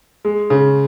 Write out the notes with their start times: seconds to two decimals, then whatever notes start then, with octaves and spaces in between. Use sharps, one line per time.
0.25 G#3
0.50 C#3